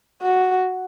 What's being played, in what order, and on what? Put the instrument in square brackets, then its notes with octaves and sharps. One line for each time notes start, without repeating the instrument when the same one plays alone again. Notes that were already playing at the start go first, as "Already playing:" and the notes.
[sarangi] F#4